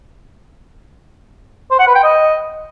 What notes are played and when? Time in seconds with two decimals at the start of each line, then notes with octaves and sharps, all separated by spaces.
1.71 C5
1.79 F#5
1.87 B4
1.95 G5
2.03 D#5